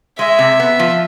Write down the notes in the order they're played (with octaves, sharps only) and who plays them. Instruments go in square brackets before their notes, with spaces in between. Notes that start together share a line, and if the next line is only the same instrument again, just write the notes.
[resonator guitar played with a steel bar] G#3 [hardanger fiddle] E5
[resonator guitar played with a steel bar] C3
B3
F3